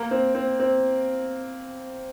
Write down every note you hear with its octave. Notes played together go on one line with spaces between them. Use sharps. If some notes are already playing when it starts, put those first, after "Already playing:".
Already playing: A#3
C4
C4
C4